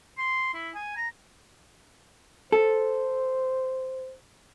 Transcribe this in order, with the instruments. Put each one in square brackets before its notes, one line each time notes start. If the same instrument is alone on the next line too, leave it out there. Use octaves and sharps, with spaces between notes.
[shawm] C6
E4
G#5
A#5
[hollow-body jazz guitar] A4 [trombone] C5